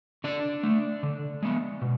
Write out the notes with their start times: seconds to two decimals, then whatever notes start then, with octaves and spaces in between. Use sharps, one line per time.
0.24 D3 D4 D5
0.63 A3
1.03 D3
1.43 G#3 B3
1.82 B2